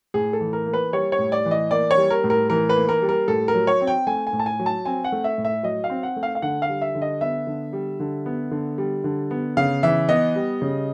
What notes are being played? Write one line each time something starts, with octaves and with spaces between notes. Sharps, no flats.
A2 G#4
A4
E3
A#4
A#3
B4
G3 C#5
C#5
A2
D5
E3
D#5
A#3 D5
C#5
G3
A#4
A2
A#4
E3 A#4
B4
A#3
A#4
G3
A#4
A2 A4
A#4
F#3
C#5
C4
G5
A3 G#5
G#5
A2
A5
G#5
F#3
A5
C4 G#5
F#5
A3
E5
A2
E5
F#3 D#5
F5
C4
F#5
A3
F5
F5
D3 F#5
F5
G3
E5
D3
D#5
B3 E5
D3
G3
D3
B3
D3
G3
D3
B3
C#3 F5
E3 E5
B3 D#5
G3
C#3